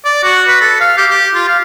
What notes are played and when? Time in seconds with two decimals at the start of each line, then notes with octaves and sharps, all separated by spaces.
0.05 D5
0.23 F#4
0.47 B4
0.61 A4
0.80 F5
0.97 G4
1.10 G4
1.34 F4
1.48 F5